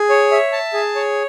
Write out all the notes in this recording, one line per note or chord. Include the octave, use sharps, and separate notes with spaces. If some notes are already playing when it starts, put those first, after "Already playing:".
Already playing: G#4
C#5
E5
A5
G#4
C#5